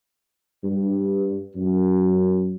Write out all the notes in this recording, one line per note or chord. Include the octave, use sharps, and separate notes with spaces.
G2
F#2